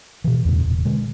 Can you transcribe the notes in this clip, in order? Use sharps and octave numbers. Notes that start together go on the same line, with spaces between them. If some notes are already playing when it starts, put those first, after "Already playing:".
B2 E3
E2 A2 C#3 G3
E1 B2
B2 D3 G#3